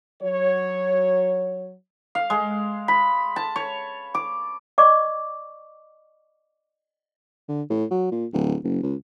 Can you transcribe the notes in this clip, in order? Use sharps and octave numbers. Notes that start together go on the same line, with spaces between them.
F#3 C#5
F5
G#3
B5
A5
C#5
D6
D5 D#5 C#6 D6
D3
A2
F#3
A#2
D1
F#1
C#2